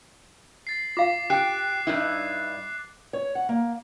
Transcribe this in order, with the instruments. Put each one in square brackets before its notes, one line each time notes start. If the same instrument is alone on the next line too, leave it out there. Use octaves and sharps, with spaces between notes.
[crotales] A6 C7
[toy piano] F4 F5 [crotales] D6
[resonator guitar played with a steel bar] G4 [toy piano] G5 [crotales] F#6 C7
[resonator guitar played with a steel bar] G2 D#4 E4
[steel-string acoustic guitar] C#5
F#5
A#3